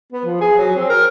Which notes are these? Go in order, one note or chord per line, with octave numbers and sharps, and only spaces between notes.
B3
F3
G#4
F#3
C4
A#4